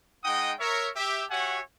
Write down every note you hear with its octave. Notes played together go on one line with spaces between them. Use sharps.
G#3 D#4 D#5 F#5 G5 D#6
A#4 C#5 E5
G4 E5
F#4 G4 C#5 E5 F#5 G#5